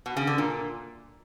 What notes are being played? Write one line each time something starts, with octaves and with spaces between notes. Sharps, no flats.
B2
C#3
D3
A#2